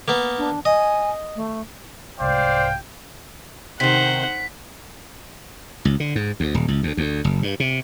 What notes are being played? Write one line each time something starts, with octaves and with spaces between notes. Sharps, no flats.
A#3 B3
D4
D#5 G#5
A3
C2 G#2 C5 D5 F5 G5
C3 D#3 D#4 C5 F#5 B6
C#2
D3
G#2
D2
D#1
C#2
D2
D2
F#1
G2
C3